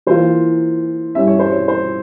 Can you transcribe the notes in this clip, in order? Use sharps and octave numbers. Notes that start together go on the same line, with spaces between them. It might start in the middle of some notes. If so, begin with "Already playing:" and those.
E3 A#3 F4 C5
G2 G3 C#4 E4 E5
C#5
C5
C#5
C5